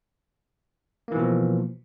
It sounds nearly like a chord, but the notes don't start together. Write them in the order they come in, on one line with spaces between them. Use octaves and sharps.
A#3 E3 B2 F3